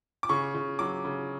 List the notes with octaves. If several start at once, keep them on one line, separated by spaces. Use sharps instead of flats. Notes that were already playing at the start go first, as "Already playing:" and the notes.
D6
C#3 C#6
C#3
F#3 D6
C#3